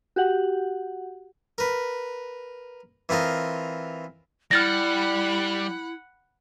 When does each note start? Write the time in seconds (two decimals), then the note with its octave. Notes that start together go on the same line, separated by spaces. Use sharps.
0.16 F#4 G4 F#5
1.58 A#4 B4
3.09 E3 C4 F4 A#4 D#5
4.51 G3 E4 F#5 B5 F6 F#6 A6 A#6